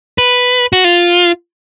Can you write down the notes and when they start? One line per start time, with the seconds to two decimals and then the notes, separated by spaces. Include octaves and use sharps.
0.18 B4
0.73 F#4
0.84 F4